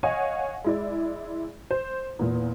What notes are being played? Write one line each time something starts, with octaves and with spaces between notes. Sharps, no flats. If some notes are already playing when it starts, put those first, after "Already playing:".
C#5 D#5 F5 F#5 G#5
G#3 E4 D5
C5
E2 A#2